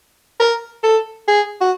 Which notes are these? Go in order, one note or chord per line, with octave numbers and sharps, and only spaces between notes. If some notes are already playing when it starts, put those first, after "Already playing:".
A#4
A4
G#4
F#4